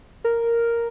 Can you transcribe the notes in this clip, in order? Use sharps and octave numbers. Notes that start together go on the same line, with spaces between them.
A#4